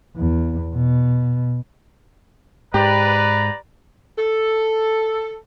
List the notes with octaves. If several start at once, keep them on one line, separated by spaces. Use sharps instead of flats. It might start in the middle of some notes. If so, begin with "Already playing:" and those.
E2
B2
G#2 G4 B4 D5 A#5
A4